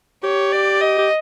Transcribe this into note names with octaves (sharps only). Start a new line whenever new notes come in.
G4 C#5
D5
D#5
G4